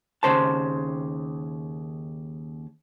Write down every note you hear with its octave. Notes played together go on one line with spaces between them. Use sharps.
D#2 C#3 C5 A5